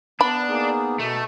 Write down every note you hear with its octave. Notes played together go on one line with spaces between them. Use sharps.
B3 D4 B5
A#3 D#4 G#4
B2 A3